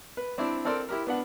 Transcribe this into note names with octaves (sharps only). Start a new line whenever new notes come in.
B4
C4 D4 E4 D5
C4 A4 A#4 D5 C6
E4 G4 A#4
B3 D4 F#5